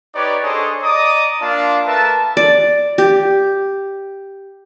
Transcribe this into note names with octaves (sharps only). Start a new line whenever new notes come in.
D#4 G4 B4 C#5 D5
D4 G#4 A4 C5 C#5 D#5
D5 D#5 A#5 D6 D#6
A#3 D4 F4 D5 F5 A5
A3 A#4 B4 E5 A5
D5
G4